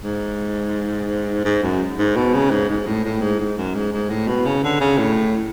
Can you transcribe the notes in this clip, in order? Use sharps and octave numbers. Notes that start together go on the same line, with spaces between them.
G#2
G#2
F#2
G#2
B2
C#3
G#2
G#2
A2
A2
G#2
G#2
F#2
G#2
G#2
A2
B2
C#3
D3
C#3
A2